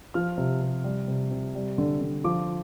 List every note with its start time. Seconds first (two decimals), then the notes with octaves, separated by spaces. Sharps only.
0.14 F3 F6
0.38 C3
0.61 C3
0.84 G3
1.08 C3
1.31 C3
1.55 G3
1.78 D3
2.01 D3
2.24 F3 D6